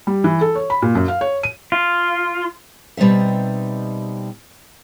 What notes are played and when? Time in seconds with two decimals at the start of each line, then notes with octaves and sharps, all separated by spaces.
0.07 G3
0.24 E3
0.41 A4
0.55 C#5
0.70 B5
0.82 A#2
0.95 F#2
1.08 F5
1.21 C#5
1.43 D#7
1.72 F4
2.97 B2 G3 C4 D#4 E5